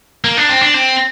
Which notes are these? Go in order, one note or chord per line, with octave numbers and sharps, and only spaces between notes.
A#3
D4
C4
D4
C4